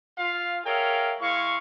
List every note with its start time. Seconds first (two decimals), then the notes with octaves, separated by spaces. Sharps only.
0.18 F4 F5
0.65 G#4 A#4 C#5 E5 F5 G5
1.21 G#3 E4 F5 C#6